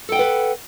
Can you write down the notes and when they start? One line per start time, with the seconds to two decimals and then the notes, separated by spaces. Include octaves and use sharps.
0.09 A4
0.12 G5
0.16 F#5
0.19 B4